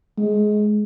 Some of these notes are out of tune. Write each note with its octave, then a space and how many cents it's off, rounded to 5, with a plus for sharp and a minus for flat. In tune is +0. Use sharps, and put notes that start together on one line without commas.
G#3 +20